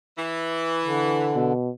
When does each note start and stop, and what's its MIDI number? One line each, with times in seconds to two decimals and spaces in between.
0.18 1.46 52
0.84 1.53 50
1.35 1.70 47